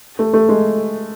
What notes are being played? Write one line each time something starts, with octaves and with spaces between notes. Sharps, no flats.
A3
A3
G#3